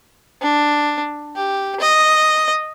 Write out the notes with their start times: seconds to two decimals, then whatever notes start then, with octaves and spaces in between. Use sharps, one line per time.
0.42 D4
1.36 G4
1.81 D#5